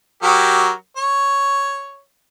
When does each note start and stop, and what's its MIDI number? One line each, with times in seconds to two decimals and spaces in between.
0.23 0.71 54
0.23 0.71 67
0.23 0.71 70
0.97 2.01 73